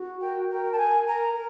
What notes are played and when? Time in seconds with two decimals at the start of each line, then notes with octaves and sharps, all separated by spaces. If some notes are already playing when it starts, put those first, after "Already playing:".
Already playing: F#4
0.21 A#4 G5
0.49 A#4 G5
0.71 A5
0.78 A#4 G#5
1.07 A#4 A#5
1.34 A#4